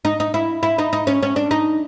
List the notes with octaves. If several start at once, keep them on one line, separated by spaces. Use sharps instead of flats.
D#4
D#4
E4
E4
D#4
D#4
C#4
C#4
D4
D#4